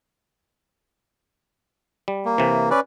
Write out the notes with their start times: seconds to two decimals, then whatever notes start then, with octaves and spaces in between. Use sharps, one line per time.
2.08 G3
2.25 A#3
2.38 C3 E3
2.71 C#4 B4 D5